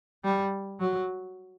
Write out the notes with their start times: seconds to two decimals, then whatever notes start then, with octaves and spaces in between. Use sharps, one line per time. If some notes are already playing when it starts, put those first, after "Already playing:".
0.24 G3
0.80 F#3